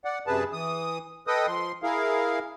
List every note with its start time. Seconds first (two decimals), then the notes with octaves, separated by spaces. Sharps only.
0.05 D5 F#5
0.27 F#2 C3 G#4 B4 A5
0.53 E3 D#6
1.27 A4 B4 D#5 G5 D#6
1.47 F3 C6
1.83 E4 G#4 A#4 F5